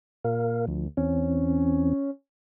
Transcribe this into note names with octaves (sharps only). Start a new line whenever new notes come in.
A#2 A#4 F5
D2 F3
E2 E3 C4 C#4